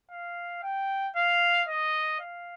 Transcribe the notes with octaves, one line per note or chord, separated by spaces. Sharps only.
F5
G5
F5
D#5
F5